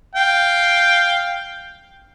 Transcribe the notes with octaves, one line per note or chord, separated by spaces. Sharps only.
F5 G5